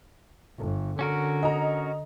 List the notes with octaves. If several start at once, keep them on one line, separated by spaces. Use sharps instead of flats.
G1
D3 C#4 F#4 A#4
D#5 A#5